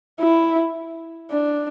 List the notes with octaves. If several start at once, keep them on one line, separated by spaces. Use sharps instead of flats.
E4
D4